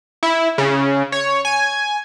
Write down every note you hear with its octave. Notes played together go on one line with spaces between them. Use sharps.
E4
C#3
C#5
G#5